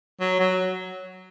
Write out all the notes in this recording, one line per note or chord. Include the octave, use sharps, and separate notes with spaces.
F#3
F#3